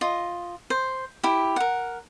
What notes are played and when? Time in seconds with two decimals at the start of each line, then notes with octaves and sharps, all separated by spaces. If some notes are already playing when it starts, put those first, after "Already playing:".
0.01 F4 D#5
0.70 C5
1.23 E4 G4
1.56 A#4 F#5